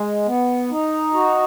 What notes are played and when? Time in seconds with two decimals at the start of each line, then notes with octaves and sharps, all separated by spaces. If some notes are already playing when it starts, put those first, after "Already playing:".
Already playing: G#3
0.26 B3
0.71 D#4
1.14 F#4